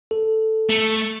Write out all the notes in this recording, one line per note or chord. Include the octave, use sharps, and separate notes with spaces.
A4
A3